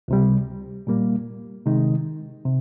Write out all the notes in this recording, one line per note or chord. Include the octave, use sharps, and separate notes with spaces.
C#2 C3 G3
A#2 G3 A#3
C3 D#3 G#3 D#4
C3